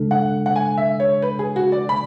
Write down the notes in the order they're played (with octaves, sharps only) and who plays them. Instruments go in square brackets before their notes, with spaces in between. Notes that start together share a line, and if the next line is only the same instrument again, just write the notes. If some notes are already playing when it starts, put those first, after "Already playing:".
Already playing: [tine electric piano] C#3 G#3 D4 A4
[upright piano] F#5
F#5
G#5
E5
C#5
B4
G#4
F#4
D5
B5